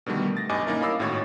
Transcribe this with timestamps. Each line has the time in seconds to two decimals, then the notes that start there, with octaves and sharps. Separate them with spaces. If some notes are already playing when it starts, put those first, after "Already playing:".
0.06 B2 D3 D#3 G3 A3
0.37 A6 A#6
0.49 B1 G2 D#5 G#5 D6
0.67 A#3 C#4 D#4 E4 A#4
0.81 D#5 F5 B5 D6 E6 C7
0.99 G#1 A2 F#4 C#5 G#6 A6